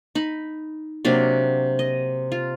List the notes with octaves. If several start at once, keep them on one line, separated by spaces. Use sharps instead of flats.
D#4 B5
C3 F#3 A#3 D4
D#5
F4